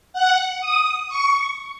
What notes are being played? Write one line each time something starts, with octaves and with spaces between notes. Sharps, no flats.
F#5
D#6
C#6